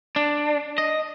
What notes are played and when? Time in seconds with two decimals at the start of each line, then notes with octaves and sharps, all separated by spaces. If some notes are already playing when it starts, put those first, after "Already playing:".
0.16 D4
0.78 D#5